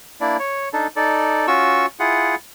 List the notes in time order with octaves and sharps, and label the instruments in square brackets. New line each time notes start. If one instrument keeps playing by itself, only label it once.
[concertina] A#3 D4 E4 D5
C#5
D4 D#4 A4
D#4 A4 D5
C#4 F4 F#4 C#6 E6
E4 F4 G#4 F#5